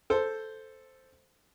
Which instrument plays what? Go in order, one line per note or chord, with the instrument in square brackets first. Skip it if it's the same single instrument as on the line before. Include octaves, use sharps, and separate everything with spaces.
[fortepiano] A4 C5